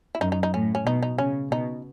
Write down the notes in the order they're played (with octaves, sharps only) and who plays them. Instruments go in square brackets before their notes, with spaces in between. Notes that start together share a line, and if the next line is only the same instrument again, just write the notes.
[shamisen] E4
[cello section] F#2 [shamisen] D#4
[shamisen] D#4
D#4
[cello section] A2 [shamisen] C#4
[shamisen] C#4
[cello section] B2 [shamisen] D#4
[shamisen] D#4
[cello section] C#3 [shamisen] C#4
[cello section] B2 [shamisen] D#4